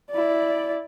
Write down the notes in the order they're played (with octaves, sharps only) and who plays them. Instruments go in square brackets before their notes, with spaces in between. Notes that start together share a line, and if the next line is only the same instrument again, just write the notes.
[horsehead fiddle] E4 D5